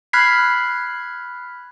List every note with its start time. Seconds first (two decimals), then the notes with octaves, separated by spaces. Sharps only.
0.13 B5 F6 F#6 G#6 B6 C7